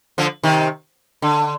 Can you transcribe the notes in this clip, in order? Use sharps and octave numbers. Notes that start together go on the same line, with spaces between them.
D3 F3
C3 D#3
D3